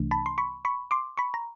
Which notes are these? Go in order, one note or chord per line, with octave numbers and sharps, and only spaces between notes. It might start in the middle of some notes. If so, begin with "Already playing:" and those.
Already playing: C2 C3 E3 A3 D4
A5 B5
C6
B5 C#6
B5 C#6
C6 D6
B5 C#6
A#5